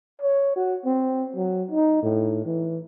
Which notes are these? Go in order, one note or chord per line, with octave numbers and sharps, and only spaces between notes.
C#5
F#4
C4
F#3
D#4
A2
E3